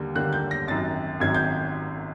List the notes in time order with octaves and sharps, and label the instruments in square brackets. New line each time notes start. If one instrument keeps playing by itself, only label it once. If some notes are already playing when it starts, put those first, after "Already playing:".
Already playing: [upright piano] D#2 D3 G3 A#3
D#2 D3 G3 A#3 F#6
G6
A#6
G#1 F#2 D#3 A6
G#1 F#2 D#3 G#6
G6